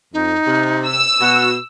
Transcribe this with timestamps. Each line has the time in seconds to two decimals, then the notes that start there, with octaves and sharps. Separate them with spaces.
0.14 F2 D#4
0.46 C3
0.87 E6
1.20 B2 F#4